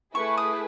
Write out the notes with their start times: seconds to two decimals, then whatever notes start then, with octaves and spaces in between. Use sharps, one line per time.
0.15 A3 E4 G#4 B4 C#6
0.38 D#6